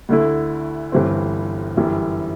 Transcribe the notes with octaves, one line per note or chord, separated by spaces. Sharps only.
D2 D3 A3 E4
G1 G2 E3 G3 C4
G1 F#2 E3 G3